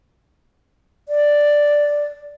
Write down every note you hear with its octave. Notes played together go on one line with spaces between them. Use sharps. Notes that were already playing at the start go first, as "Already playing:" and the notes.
D5